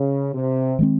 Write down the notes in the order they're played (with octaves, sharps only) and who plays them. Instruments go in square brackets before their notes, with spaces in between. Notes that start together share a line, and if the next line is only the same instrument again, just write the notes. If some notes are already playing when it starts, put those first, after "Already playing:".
Already playing: [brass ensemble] C#3
C3
[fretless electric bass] D#3 G#3 C4